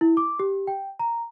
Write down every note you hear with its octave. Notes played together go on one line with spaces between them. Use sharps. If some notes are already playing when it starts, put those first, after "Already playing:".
E4
D6
G4
G5
A#5